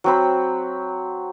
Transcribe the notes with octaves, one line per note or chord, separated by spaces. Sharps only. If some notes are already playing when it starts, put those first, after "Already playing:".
F#3 C4 B5